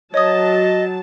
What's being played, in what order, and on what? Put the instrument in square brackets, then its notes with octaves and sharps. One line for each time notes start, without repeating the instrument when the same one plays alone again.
[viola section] F#3 A5 [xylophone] C#5 D#6 [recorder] D#5